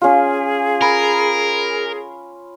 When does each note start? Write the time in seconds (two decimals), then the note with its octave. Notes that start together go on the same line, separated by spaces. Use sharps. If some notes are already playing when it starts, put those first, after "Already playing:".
0.02 C#4 F4 G#4
0.81 A#4 B5